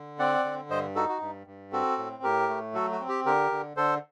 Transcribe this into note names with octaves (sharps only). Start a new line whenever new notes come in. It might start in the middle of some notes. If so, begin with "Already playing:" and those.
Already playing: D3
C4 D5 F#5
D3
G2 C5 D#5
D#4 F#4 A4
F#4
G2
G2
C4 F#4 A4
A2
A2 G4 A#4
A3
F#3 F#4 A4
F#4
C4
G4
D3 G4 A#4
D3
D3 A4 C5